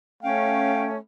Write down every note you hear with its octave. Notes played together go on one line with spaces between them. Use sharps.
A3 C#4 F5 G5